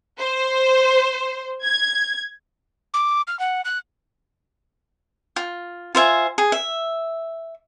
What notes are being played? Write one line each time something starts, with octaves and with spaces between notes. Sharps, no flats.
C5
G#6
D6
F6
F#5
F#6
F4
F4 C5 E5 G#5
G#4
E5